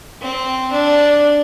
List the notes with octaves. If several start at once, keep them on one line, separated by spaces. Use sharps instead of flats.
C4
D4